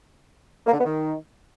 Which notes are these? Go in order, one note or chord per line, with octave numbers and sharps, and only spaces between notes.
A#3
D3
B3
D#3